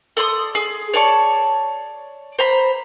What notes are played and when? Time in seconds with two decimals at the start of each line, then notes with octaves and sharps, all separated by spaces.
0.17 A4 D5 C6 D#6
0.55 G#4
0.93 C#5 D5 A5 C#6
2.39 C5 A#5 B5